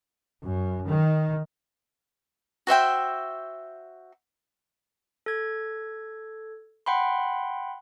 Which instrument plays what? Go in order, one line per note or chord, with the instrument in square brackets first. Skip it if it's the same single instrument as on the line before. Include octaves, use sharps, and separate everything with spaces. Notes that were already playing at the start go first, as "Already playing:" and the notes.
[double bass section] F#2
D#3
[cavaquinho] F#4 C5 E5 G5
[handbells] A4 G#6
F#5 G5 B5 C6